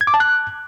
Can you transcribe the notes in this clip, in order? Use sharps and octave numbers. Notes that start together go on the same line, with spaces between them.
G#6
D6
A5
F#6